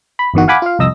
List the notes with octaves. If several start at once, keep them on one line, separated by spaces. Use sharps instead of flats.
B5
G1 E2 D#3 F#4
F5 F#5 G#5 B5 D6
F4 F5
C2 F2 D#5 E6 A#6